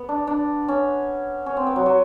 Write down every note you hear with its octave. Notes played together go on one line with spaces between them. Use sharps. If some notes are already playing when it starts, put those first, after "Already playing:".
Already playing: B3
D4
D4
C#4
C#4
C4
B3
F#3
F#3